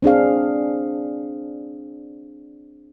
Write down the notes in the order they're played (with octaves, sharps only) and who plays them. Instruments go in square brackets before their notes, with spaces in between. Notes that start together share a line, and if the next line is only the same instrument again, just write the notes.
[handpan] C4 D4 G#4 F5